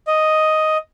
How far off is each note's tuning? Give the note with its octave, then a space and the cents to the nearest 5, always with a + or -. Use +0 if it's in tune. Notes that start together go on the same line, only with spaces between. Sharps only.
D#5 +5